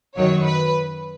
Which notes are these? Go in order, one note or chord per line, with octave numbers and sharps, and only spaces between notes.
F#2 D#3 F#3 C#5
B4